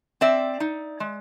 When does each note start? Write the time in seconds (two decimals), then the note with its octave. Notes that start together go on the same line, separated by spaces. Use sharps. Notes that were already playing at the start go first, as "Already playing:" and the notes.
0.21 C4 D5 E5
0.60 D#4
1.00 G#3